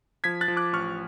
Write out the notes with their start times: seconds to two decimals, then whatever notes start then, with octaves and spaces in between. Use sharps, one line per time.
0.24 F3 G#6 B6
0.41 F#6 A6
0.48 F3
0.56 D6 F#6
0.73 A1 C#6 F6